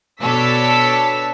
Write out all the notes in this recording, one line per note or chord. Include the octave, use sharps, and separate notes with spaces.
B2 D4 A4 C#5 E6 B6